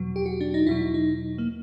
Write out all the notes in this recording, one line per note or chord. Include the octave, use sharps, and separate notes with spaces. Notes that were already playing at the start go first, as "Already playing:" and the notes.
Already playing: E2 B2 F#3
G4
F#4
D4
D#4
E2 B2 F#3 E4
D#4
A#3